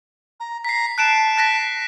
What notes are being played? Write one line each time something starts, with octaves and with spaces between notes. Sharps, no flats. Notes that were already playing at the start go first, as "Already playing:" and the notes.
A#5
A#5 B6 C7
A5 F#6 D7 E7
F#6 A#6 B6